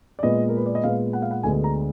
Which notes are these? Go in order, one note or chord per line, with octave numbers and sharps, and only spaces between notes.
D5
A#2 G#3 B3 D#5
A#4
B4
D5
D#5
A#2 G#3 B3 F5
F#5
F5
F#5
D2 D3 G#3 B3 G#5
A#5